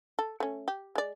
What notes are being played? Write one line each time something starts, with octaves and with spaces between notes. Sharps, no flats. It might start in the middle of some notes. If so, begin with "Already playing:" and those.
A4
A3 C#4
G4
G#3 D5